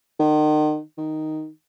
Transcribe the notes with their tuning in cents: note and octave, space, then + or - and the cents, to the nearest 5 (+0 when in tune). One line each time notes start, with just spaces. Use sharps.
D#3 -35
D#3 +0